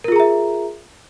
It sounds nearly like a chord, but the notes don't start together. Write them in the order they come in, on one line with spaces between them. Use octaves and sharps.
A#4 F4 G#4 A#5 E5